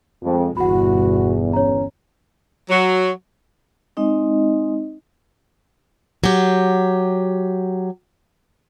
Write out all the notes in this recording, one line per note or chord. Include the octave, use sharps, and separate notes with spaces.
F2 G#3
G1 E2 G2 B2 F#4 F#5 B5
C#4 C#5 A#5
F#3
G#3 C4 D#4 D#5
F#3 G4